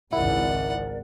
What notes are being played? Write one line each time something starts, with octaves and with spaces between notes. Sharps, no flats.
G#1 C#2 G#2 E4 A#4 D5 F#5